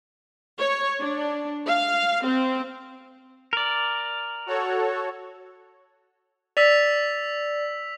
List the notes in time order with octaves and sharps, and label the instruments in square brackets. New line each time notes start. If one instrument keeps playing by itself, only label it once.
[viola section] C#5
D4
F5
C4
[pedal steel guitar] A#4 D5
[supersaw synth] F#4 A4 C#5
[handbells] D5 [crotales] E6 B6 F7